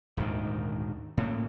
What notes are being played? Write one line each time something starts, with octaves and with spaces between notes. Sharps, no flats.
D#1 D2 G#2 D#3
A2 C#3 A#3